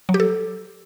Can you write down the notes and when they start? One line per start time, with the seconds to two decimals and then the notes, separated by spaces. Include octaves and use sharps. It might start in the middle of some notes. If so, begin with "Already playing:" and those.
0.09 F#3
0.14 G4
0.20 A4